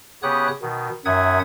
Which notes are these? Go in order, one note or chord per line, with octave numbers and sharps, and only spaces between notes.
C#3 B3 G4 C#5 D#6 F#6
B2 D#3
F#2 D#3 E5 F#5 D#6 G#6